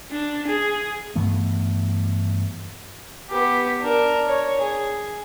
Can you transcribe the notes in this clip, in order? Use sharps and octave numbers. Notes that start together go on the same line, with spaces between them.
D4
G#4
G2 E3 A3 B3
B3 G4
D4 A#4
C#5
G#4